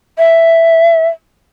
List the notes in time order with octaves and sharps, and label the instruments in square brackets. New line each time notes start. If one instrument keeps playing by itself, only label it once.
[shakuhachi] E5